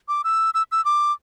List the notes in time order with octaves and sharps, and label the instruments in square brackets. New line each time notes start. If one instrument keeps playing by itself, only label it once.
[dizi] D6
E6
E6
E6
D6